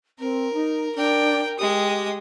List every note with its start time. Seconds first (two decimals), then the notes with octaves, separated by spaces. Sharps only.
0.19 C4 A#4
0.53 D#4
0.95 D4 A#4 G5
1.59 G#3 G4 D#6